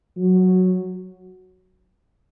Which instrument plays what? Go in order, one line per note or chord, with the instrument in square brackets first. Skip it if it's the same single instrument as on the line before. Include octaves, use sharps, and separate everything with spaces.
[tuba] F#3